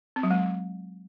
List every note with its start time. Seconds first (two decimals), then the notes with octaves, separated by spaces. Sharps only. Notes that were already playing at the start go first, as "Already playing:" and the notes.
0.16 C4
0.23 F#3
0.31 G#3